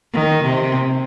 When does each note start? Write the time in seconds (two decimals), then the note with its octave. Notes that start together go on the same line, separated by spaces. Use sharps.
0.13 D#3
0.43 C3